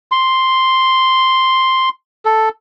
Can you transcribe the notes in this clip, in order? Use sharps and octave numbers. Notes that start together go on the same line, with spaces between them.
C6
A4